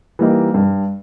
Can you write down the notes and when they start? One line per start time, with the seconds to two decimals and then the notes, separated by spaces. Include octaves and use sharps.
0.19 E3 G3 A#3 D#4
0.54 G2